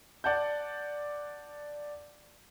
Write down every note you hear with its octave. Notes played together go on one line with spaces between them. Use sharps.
D5 F#5 A5 G6